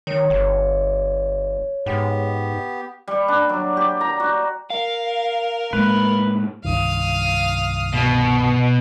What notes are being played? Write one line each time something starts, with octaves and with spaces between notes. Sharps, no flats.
D#3 C#5
G1
G#2 B3 G4
G3
D4
F#3
G4
A#5
F#4
A#4 F5
A2 G#3 A#3 B4
C2 G2 D#3 F5 D#6
B2